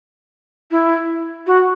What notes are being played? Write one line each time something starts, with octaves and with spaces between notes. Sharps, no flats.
E4
F#4